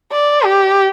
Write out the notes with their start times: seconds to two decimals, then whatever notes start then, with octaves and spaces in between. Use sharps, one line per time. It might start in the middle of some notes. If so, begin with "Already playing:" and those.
0.12 D5
0.45 G4